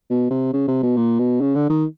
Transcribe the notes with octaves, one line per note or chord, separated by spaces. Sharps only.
B2
C3
C#3
C3
B2
A#2
B2
C#3
D3
D#3